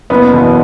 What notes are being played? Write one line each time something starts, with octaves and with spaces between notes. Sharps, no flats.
F#1 B3
E2 B2